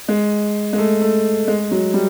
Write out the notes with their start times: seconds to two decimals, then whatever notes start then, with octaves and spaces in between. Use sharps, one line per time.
0.08 G#3
0.73 G#3
0.78 A3
1.01 A3
1.48 G#3
1.71 F#3
1.94 G3